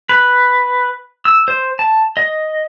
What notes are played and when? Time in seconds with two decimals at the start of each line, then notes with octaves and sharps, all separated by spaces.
0.09 B4
1.25 E6
1.48 C5
1.79 A5
2.17 D#5